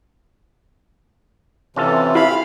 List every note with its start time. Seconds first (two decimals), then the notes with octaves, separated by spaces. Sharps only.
1.76 C3 E3 C#4 F4 A4
2.15 E4 F5 B5